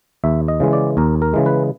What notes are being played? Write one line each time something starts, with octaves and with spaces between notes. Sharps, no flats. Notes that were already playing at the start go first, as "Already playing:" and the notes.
D#2 E5
D#5
C#3 E3 G#3
D5
D#2 A#4
A#4
C#3 E3 G#3
B4